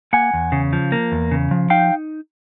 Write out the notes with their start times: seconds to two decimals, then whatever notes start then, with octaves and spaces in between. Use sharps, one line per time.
0.13 A#3 F#5 G#5
0.34 E2
0.52 C#3
0.73 F3
0.92 A#3
1.12 E2
1.31 C#3
1.51 F3
1.70 D#4 F5 G5